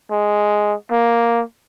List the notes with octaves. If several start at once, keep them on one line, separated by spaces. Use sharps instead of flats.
G#3
A#3